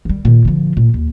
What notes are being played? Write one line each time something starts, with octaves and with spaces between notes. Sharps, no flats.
D#3 G3
A#2 D#3
D3 F3
A#2
D#2